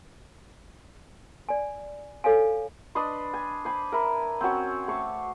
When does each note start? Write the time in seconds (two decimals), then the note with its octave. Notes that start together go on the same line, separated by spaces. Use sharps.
1.49 D5 G#5
2.24 A4 C#5 F5 G#5
2.95 D4 B4 D#5 C6
3.34 G#5
3.65 C5 G#5 B5 D6
3.92 A#4 E5 B5
4.41 C4 C#4 F#4 C#5
4.88 A3 C5 C#6 D6